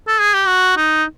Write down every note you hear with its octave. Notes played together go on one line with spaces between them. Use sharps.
A4
G#4
G4
F#4
D#4